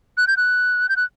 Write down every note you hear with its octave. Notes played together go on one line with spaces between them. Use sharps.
F#6
G6
F#6
G6
F#6